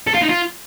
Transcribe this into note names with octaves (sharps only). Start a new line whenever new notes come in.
A4
F4
D#4
F4